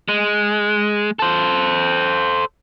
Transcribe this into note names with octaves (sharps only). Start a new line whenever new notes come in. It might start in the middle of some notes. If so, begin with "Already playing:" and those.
G#3
A4 C5